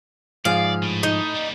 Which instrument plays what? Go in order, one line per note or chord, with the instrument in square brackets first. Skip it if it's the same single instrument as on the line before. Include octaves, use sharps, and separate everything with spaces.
[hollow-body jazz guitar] G#2 F3 G#4 [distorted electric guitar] D5 [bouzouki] F5
[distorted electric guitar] A2
[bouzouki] D#4
[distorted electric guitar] G3 A#3